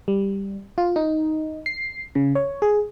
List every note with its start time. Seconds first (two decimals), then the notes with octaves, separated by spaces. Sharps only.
0.08 G3
0.78 F4
0.96 D#4
1.66 C7
2.15 C#3
2.35 C#5
2.62 G#4